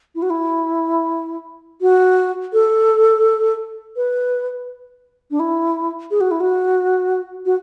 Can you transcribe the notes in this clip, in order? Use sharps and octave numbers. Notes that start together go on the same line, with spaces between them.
E4
F#4
E4
F#4
A4
B4
D4
E4
G#4
F#4
E4
F#4
F#4